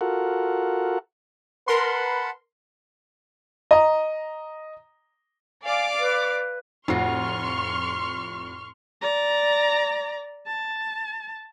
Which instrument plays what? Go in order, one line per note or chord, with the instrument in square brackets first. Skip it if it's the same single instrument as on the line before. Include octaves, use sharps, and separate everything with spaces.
[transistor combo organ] F4 F#4 A4 A#4 F#5
[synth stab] A#4 C6 [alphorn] B4 [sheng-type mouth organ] F#5 A5 B5
[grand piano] D#5 A#5
[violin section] D5 F5 D6 [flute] G#5
[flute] B4
[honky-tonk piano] F1 F4 C7 [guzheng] A2 F#4 [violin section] C6 C#6 F6
[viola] D5 A#5
A5